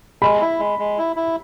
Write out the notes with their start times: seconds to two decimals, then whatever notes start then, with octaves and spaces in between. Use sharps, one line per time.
0.22 G#3 B5
0.41 E4
0.59 G#3
0.79 G#3
0.98 E4
1.16 E4